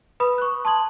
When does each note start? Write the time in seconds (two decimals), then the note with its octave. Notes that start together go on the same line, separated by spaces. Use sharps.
0.20 B4 B5 D#6
0.38 C#6 F#6
0.65 A5 C6 D#6 G#6 F#7